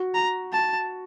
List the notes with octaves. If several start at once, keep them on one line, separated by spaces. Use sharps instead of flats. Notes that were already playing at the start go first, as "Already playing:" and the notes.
Already playing: F#4
A#5
A5